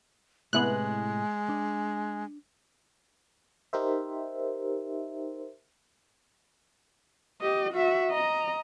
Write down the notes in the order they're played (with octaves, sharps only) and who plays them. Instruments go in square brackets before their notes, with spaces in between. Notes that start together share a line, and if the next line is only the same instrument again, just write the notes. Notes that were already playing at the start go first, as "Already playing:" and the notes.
[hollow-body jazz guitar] A2 C3 B5 [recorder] G#3 [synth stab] B3 E4 F#6
[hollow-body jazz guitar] D4
[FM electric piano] D#4 G4 A#4 C5 E5
[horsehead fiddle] G4 D#5
F#4 E5
D#5 A#5